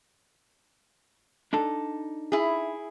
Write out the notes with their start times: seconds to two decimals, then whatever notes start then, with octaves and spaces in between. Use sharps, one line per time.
1.53 D4 D#4 A4
2.32 E4 G#4